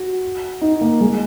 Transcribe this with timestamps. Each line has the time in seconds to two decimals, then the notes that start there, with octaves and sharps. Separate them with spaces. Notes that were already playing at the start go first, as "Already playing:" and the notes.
Already playing: F#4
0.61 D#4
0.81 A#3
1.01 G#3